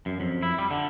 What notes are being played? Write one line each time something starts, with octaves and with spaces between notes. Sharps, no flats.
F#2
F2
E4
G3
D3